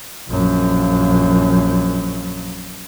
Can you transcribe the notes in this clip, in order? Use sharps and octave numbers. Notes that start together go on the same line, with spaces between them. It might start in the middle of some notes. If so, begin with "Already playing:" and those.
A#1 F#2